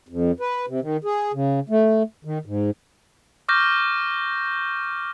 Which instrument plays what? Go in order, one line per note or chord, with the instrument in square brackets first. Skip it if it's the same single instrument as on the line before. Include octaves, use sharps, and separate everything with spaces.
[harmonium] F2
B4
C3
D#3
G#4
C#3
A3
D#3
G#2
[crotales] C#6 D6 F6 G6 A#6